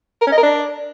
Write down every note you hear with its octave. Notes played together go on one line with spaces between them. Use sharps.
A#4
C#4
D#5
A#4
D4